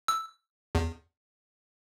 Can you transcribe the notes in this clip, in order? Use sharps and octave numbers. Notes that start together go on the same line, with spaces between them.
E6
E2